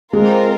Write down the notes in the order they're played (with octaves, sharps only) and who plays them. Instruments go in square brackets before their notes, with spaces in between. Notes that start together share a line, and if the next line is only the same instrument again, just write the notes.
[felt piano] G#3 [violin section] C4 F4 A#4